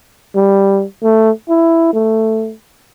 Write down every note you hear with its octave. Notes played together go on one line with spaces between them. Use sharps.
G3
A3
E4
A3